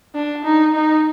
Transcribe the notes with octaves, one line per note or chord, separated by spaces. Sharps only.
D4
D#4
D#4